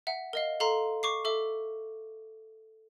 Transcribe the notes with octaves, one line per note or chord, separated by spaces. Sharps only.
E5 F#5
A#4 D#5 F5
A4 F5 A#5 C6
C#6 D6 C7
A4 E5 D6